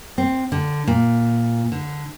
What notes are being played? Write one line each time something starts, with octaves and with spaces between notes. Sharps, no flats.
C4
D3
A#2
D3